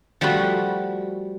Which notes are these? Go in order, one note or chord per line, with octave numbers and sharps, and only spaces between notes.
F3 G3 A3 F#4 B5